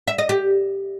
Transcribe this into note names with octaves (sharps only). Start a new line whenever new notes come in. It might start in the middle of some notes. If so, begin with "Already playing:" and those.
E5
D#5
G4